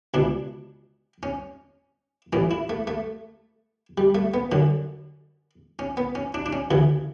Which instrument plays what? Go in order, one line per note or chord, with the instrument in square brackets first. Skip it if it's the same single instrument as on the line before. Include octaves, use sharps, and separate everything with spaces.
[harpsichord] C#2 B2 D4
C#4
A1 A2 E3 C#4
E4
A3
A3
G3
A3
B3
F#2 D3 C#4
C#4
B3
C#4
D4
D4
C#4
D2 C#3 E3